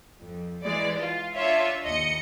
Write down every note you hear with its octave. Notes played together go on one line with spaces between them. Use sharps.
F2
E3 G#3 D5
F4
D4 F4 C#5 E5
D#2 D#5 C#7